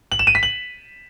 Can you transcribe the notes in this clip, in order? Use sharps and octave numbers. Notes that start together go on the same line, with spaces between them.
F#7
E7
D#7
B6
F#7